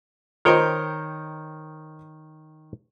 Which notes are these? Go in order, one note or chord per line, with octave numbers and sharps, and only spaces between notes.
D#3 A#4 C5 C#5 D#5 G5